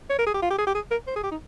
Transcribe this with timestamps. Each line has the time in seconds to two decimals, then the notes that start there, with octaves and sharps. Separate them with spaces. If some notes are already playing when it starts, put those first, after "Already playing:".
0.10 C#5
0.19 A#4
0.26 G#4
0.34 G4
0.42 F4
0.50 G4
0.58 G#4
0.67 G4
0.75 G#4
0.91 A#4
1.07 C5
1.16 G#4
1.23 G4
1.31 D#4